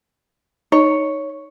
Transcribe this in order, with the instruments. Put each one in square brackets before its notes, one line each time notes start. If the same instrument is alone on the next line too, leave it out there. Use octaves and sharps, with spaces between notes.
[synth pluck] D#4 [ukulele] C#5